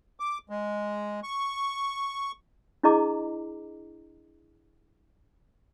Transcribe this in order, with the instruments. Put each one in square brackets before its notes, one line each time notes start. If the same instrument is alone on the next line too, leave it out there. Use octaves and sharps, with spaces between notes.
[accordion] D6
G#3
C#6
[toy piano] D4 E4 G#4 D#5 A#5 D6